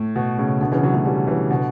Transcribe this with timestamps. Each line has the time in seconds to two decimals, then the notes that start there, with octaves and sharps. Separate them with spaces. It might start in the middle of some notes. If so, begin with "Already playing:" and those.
Already playing: A2
0.16 B2
0.38 A2 C#3
0.61 B2 D3
0.71 C#3 E3
0.83 D3 F#3
0.94 F#3 A3
1.05 E3 G3
1.28 C#3 E3
1.50 B2 D3